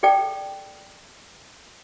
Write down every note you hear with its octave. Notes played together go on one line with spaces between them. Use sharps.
G#4 A4 D5 G5 A5